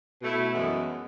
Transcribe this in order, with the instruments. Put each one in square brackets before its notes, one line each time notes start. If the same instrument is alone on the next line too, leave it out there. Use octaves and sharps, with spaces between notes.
[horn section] B2 A3 E4
F#2 E3 G#3 B3